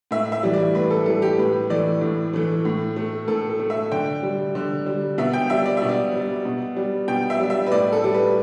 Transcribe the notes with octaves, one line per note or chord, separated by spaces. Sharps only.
A2 E5
E5
E3 G3
D5
A2 B4
A4
E3 G3 A4
G4
A2 B4
E3 A3 D5
A2
E3 A3
A2
A3
A2 A4
A4
A3
E5
D3 G5
G3
D3
G3
B2 E5
G5
G3 E5
D5
B2 E5
D5
G3
B2
G3
B2 G5
E5
G3
E5
B4
A2 D5
A4
G3
B4